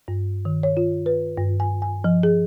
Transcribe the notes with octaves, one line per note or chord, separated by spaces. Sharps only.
G2
D#3
C#5
F4
B4
G2
G#5
G#5
F3
G#4